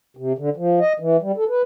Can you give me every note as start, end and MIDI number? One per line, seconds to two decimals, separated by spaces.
0.17 0.33 48
0.38 0.50 50
0.57 0.79 53
0.80 0.93 75
1.00 1.17 52
1.22 1.32 55
1.37 1.44 69
1.49 1.62 71